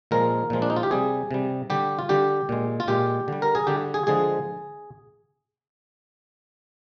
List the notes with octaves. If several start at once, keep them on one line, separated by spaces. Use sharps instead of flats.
A#2 F3 G#3 A#4
A#2 F3 G#3
D4
D#4
F4
G4
C3 G3 G#4
C3 G3
D3 G3 G4
F4
D3 G3 G4
A#2 G#3
F4
A#2 G#3 G4
D3 G3
A#4
G#4
D3 G3 G4
G#4
D3 F3 G#3 G#4